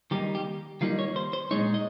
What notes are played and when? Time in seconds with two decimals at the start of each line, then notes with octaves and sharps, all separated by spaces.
0.11 D#3 G3 A#3 D#4 G4
0.35 G4
0.81 D#3 G3 A#3 D#4 F4
0.99 C#5
1.16 C5
1.33 C5
1.51 A#2 G#3 D#4 C#5
1.74 D#5